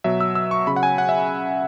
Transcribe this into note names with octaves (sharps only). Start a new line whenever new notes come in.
B2 F#3 E5
E6
E6
C#6
C#3 F#3 B5
F#5
G#5
F#5
E5